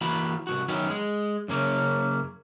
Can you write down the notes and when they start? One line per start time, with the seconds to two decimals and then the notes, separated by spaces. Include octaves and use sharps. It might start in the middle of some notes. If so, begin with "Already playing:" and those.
0.01 E3 A#3 F#4 B5
0.47 C2 F3 F#4
0.68 F#2 D#3 F#3 B3 C#4
0.90 G#3
1.48 F#2 C#3 A#3 C#4